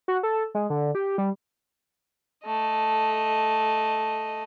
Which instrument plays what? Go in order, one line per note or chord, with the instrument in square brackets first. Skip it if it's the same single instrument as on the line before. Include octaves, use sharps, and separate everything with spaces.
[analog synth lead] F#4
A4
G#3
D3
G4
G3
[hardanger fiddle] A3 D#5